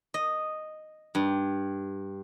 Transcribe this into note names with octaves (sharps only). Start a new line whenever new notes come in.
D#5
G2